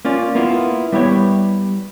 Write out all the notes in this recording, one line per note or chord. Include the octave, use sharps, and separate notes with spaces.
A#3 C#4 F4 D5
A#3 B3 E4 F4
G3 B3 E4 G4 C#5